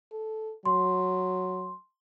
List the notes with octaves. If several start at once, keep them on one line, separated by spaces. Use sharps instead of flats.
A4
F#3 C6